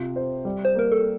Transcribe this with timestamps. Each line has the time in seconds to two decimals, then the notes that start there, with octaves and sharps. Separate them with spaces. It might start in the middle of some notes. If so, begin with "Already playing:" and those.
Already playing: C3 F4
0.16 C5
0.45 G3
0.65 C5
0.75 A#3 A#4
0.92 A4